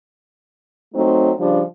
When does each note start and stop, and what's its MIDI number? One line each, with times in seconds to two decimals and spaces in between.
0.95 1.31 54
0.95 1.31 57
0.95 1.31 60
0.95 1.31 63
1.38 1.61 49
1.38 1.61 53
1.38 1.61 55
1.38 1.61 62